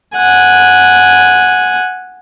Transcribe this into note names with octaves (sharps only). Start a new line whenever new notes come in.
F#5 G#5